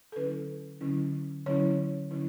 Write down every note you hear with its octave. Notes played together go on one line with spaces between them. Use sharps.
A4
D3 F#3 C#4 E4 B4
D3 F#3 C#4 E4
D3 F#3 C#4 E4 C#5
D3 F#3 C#4 E4